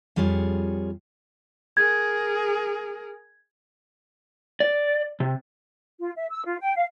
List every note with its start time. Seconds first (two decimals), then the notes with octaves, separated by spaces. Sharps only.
0.16 F2 G3 F4 G#4 C#5
1.77 G#4 A#4 G#6
4.60 D5
5.20 C3
5.99 F4
6.16 E5
6.30 E6
6.45 F4
6.60 G5
6.76 F5